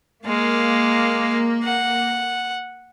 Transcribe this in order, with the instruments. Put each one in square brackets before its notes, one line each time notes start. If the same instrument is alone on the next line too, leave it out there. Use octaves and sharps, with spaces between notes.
[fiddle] G#3 F5 [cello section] A#3
[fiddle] F#5